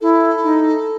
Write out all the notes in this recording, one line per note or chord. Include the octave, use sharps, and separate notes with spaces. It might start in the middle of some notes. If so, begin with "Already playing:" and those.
E4 A4
D#4